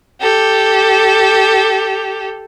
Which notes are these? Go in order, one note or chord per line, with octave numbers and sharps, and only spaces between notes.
G4 A4